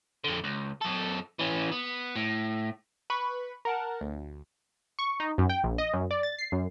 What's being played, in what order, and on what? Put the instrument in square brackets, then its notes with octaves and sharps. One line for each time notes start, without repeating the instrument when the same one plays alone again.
[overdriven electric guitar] F2 D3
C#2
F#2 A4
E3 C#4
B3
A2
[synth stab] B4 B5 C#6
A#4 F#5 A5
D2
[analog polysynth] C#6
D#4
F#2
G5
A#1
D#5
F#2
D5
A6
C7
F#2